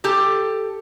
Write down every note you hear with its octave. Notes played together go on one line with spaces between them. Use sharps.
G4 A4